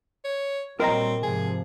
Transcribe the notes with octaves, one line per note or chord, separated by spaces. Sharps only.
C#5
A#2 F#3 G3 C4 A#4 D#5 A#5
G#2 C3 F3 G#4